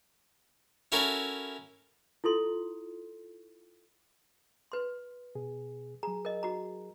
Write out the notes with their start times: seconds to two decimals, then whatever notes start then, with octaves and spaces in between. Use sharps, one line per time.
0.92 C#4 E4 F#4 A4 A#4
2.24 E4 F4 A4 C6
4.72 B4 C6
5.35 B2 G#4
6.03 F#3 G#4 A#5
6.25 A#4 D#5
6.43 F#4 A#5